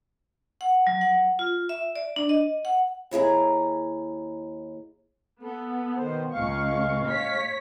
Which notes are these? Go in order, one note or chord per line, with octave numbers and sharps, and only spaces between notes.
F#5
F#3
F#5
F4
E5
D5
D4
D#5
F#5
D#2 E4 G#4 A#5
B3 A4
B2 D#3 C5
C#2 G#3 F5 C#6
C#5 B6